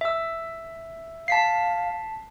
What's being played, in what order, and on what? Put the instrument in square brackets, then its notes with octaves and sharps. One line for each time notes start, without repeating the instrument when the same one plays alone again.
[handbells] E5 E6
[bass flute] F5 [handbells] A5 B6 C7